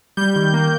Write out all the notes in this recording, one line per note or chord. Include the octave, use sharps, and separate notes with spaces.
G3 G6
D#3
A#3